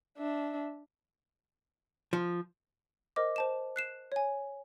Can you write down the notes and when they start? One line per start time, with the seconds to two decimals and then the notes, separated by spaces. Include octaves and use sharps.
0.18 D4 E5
2.13 F3
3.16 A#4 C5 D#5 D6
3.36 C5 A5 E7
3.76 F#6 C7 E7
4.12 C#5 G#5